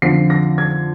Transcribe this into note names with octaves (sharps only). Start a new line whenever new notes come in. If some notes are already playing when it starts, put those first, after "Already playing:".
F2 D3 F3 C7
A#6
G#6